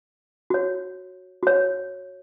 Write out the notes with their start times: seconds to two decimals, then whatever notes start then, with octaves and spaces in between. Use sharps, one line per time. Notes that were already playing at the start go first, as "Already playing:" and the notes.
0.50 F#4 C#5
1.43 F#4 C#5